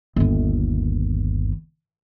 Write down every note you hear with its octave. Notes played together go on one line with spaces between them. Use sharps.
G1 D#2